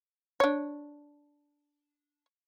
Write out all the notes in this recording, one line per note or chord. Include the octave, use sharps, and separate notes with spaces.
D4 C#5